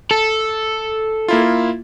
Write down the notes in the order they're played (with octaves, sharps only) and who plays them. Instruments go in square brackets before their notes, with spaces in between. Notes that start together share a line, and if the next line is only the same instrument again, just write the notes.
[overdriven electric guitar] A4
[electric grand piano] A#3 E4 F4